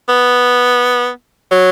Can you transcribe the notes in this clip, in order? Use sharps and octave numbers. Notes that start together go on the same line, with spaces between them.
B3
F#3